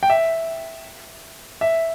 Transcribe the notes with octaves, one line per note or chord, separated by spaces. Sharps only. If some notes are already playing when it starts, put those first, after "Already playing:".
G5
E5
E5